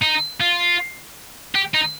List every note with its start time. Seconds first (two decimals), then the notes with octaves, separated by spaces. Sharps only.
0.02 D#4
0.40 F4
1.55 G4
1.75 D#4